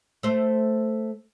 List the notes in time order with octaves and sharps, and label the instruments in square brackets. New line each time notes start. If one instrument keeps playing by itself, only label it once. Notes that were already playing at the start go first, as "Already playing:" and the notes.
[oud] A3 C5